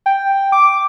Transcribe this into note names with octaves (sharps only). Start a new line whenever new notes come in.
G5
D6